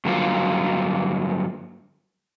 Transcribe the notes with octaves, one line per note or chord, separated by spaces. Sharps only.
G2 D3 F#3 A#3 F4